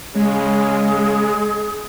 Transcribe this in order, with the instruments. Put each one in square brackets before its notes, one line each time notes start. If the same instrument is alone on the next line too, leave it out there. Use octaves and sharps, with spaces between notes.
[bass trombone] C#3 [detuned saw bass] G#3 [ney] G#4